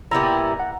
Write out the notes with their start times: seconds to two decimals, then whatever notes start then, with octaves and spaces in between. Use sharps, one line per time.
0.11 A#2 G3 B3 E4 A#5
0.60 F#5